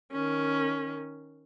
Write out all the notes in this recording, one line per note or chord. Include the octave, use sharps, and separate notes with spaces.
D#3 C#4